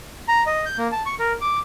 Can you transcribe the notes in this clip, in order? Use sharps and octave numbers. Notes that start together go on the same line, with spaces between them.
A#5
D#5
G6
A#3
A5
C#6
A#4
D6